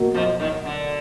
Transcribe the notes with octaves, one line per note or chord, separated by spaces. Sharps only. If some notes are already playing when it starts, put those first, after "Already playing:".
Already playing: B2 F#3 A#3
F2 F3
D#2 D#3
D3